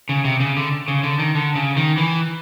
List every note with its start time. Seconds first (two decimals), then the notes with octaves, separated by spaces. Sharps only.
0.09 C#3
0.25 C3
0.40 C#3
0.57 D3
0.88 C#3
1.03 D3
1.19 D#3
1.35 D3
1.56 C#3
1.77 D#3
1.98 E3